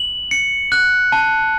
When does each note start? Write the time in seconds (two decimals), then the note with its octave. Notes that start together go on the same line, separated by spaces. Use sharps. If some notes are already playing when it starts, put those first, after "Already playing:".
Already playing: F#7
0.31 C#7
0.72 F#6
1.12 A5